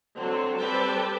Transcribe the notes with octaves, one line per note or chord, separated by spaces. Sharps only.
D3 F#3 C4 C#5
G3 C4 A4 B4 D5 G5